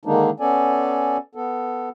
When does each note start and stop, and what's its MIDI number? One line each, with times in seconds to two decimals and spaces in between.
0.05 0.30 50
0.05 0.30 51
0.05 0.30 56
0.05 0.30 58
0.05 0.30 62
0.05 0.30 63
0.40 1.17 59
0.40 1.17 61
0.40 1.17 69
0.40 1.17 74
0.40 1.17 80
1.35 1.89 59
1.35 1.89 69